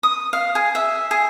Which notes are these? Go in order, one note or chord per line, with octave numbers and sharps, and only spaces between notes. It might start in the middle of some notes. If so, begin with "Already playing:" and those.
D#6
F5
G#4
E5
G#4